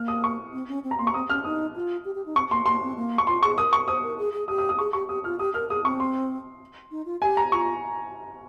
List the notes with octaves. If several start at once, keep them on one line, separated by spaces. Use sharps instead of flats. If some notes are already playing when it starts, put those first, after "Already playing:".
Already playing: A#3 F6
D#6
C#6
C4
C#4
C4
A#5
A#3 C6
C#6
C4 D#6
C#4 F6
D#4 D#6
F4
G4
G4
D#4
C4 C#6
A#3 C6
A#3 C6
C4
A#3
C#6
F4 C6
G#4 C#6
A#4 D#6
C#6
C5 D#6
A#4
G#4
G#4
G4 D#6
D#6
D#6
G#4 C#6
G4 C#6
G4 D#6
F4 F6
G4 D#6
A#4 F6
G#4 D#6
C4 C#6
C6
D#4
F4
G4 G#5
A#5
F4 C#6